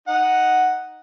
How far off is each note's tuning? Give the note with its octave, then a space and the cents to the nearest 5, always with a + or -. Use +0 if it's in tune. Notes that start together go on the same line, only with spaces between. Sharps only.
D#4 +0 F#5 +0